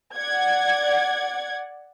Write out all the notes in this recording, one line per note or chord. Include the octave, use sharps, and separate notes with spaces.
D5 F#5 G#6